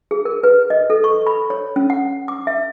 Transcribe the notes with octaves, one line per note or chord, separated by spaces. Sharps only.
G#4
A#4
B4
D#5
A4
C#6
B5
C#5
C#4
F#5
D6
E5